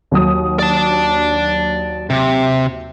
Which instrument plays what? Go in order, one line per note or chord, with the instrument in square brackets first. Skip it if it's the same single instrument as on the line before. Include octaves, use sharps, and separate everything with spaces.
[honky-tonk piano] D#2 F#3 D#6
[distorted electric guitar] D5 A5
C3